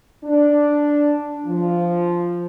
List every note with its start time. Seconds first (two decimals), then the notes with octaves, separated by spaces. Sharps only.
0.24 D4
1.46 F3